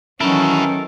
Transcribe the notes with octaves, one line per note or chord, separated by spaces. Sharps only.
D#3 E3 F#3 C#4 E4 F#4 A4 A#4